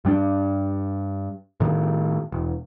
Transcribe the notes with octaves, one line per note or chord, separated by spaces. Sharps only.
G2 G3 B3 D4
A2 D#3
E1